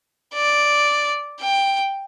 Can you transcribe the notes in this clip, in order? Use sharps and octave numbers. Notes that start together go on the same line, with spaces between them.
D5
G5